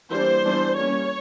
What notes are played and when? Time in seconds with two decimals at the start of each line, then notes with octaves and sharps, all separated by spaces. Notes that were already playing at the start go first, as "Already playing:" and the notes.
0.10 E3 G3 A#3 D4 C5
0.43 E3 G3 B3 D4
0.76 G3 A#3 C#4 C#5